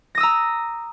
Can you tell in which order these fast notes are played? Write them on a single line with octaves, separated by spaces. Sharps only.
A#6 D#6 E6 A#5